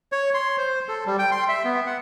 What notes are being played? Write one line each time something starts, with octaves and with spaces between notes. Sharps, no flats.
C#5
C6
C5
A4
G3
G5
C6
E5
B3
F#5